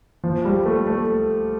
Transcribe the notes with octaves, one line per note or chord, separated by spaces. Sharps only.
F3
G3
A3
A3